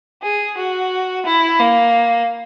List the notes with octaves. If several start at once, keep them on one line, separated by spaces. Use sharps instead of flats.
G#4
F#4
E4
A#3